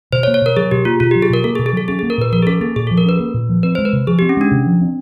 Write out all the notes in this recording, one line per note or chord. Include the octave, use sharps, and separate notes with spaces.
B2 C5
C#5
A#3
C#5
B2 A#4
F#3 G#4
B2 G4
A#3 F4
B2 F4
F#3 G4
G#4
B2 A#4
A#3 A4
G#4
B2
G#4
F#3 A4
C#4 G#4
A#3 G#4
A#4
A#2 B4
F3 A#4
G#4
C#4 A4
A#3 G#4
A#2 G#4
F3 A4
A#4
C#4 B4
A#3
A#2
F3
C4 B4
G#3 C5
B4
C3
F3 G#4
C4 G4
C#4
G#3 D4
C3
F3
C4